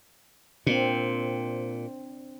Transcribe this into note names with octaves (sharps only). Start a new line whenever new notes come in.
A#2 C4 D4